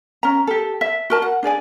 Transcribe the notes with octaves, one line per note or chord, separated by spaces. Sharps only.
C#4 A#5
G4 A4
E5
F#4 A#4 A5
F#5
D4 G#4 D5 G#5